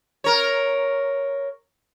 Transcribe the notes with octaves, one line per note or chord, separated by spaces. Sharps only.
A#4 C#5